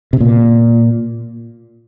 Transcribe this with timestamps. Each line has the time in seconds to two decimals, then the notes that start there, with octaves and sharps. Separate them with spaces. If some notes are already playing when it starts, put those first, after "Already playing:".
0.13 C3
0.20 A#2